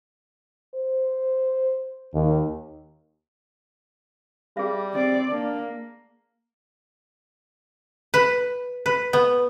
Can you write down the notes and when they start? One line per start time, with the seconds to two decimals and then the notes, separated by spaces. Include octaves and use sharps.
0.74 C5
2.14 D#2
4.57 G3 G#4 E5
4.93 C4 D5
5.30 A#3 D4
8.14 B4
8.86 B4
9.13 B3